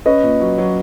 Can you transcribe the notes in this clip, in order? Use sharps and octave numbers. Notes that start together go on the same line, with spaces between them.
C#4 B4 D#5
A#2
F#3
F#3